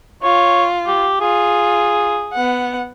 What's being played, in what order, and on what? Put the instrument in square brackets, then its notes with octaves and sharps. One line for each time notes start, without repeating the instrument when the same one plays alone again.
[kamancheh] F4 [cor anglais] C#5
[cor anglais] G4
[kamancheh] F4 [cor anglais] G#4
[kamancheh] B3 F#5